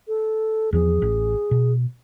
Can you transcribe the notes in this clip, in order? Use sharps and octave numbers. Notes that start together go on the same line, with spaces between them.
A4
E2 F3 G#4
A1
B2